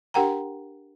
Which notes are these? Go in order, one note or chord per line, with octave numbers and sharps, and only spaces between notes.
D4 G4 A#4 F#5 G5 A#5